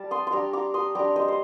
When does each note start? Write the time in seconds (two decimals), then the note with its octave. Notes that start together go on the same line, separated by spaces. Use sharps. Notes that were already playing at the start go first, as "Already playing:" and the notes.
Already playing: G3 A5
0.11 C6 D#6
0.27 C6
0.32 G3 D4 A#5 D6
0.53 A#5 D6
0.74 C6 D#6
0.95 G3 D4 A#5 D6
1.16 C5 D#5
1.28 C5